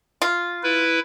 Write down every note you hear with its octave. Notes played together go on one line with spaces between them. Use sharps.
F4
E4 B4